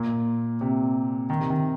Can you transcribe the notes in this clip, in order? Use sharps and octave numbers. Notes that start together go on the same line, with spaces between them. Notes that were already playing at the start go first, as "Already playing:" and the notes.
Already playing: A#2
C3
D#3
C3
D#3